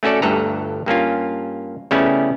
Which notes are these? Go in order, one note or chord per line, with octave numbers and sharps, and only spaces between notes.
A3 C#4 F#4 A4 D5
G1 D2 G2 A4 B4 A#5
G2 A#3 C#4 F4
C#3 G3 A3 B3 C#4 E4